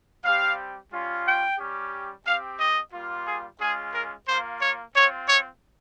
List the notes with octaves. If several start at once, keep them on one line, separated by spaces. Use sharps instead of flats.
G3 C4 G4 F5
G3 C#4 F4
G5
G3 C#4 G4
C4 G4 F5
D#5
G3 A#3 F4
G#4
G#3 C#4 F4 G#4
A#4
A#3 F4 C5
C#5
C4 F4 C#5
C#5